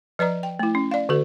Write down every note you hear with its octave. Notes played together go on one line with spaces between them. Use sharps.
F3 B4 D5 A#5
G5
A3 E4
C#4
D5 F5
D3 F#4 A4